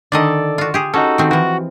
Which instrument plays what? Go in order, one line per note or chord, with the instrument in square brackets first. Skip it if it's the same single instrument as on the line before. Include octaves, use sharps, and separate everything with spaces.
[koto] D3 D#3 D#5 [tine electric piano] A4 D5
[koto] F4 F#4
G4 G#4
[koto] C#4 [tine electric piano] D#4 F#4 A4
[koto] D#3 C4
[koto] E3 F3 [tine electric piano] F#4